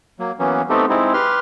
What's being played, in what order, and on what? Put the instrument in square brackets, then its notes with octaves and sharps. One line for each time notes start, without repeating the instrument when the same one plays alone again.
[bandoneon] F#3 A#3
E3 F#3 A#3 B3 C#4
A3 B3 C4 D#4 G4 A4
G#3 C4 D#4 E4
G4 B4 C6 F6